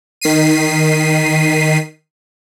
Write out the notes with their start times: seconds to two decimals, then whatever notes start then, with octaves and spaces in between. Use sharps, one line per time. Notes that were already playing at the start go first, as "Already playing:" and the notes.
0.21 D#3 B6 C7 D#7